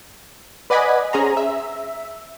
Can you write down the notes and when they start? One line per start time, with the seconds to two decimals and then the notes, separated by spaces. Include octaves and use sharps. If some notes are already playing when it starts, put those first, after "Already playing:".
0.70 B4 D5 D#5 F#5 G#5 B5
1.13 C#4 G#4 C5 A#5
1.37 E5